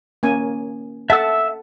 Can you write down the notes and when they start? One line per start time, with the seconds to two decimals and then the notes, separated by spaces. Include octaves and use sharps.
0.23 A#3 C#4 G#5
1.10 A4 E5 F#5 A5 E6